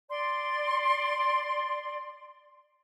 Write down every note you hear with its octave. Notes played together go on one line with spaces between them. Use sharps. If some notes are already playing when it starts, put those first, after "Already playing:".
D5 C6